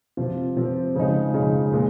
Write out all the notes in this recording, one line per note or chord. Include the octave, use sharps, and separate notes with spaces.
C3 F3 C4 F4
C3 F3 C4 F4
C#3 F3 G#3 D#4
C#3 F3 G#3 D#4
A#2 G#3